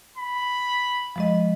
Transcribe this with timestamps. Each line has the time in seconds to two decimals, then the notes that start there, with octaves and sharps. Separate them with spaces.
0.18 B5
1.16 F3 G#3 D#5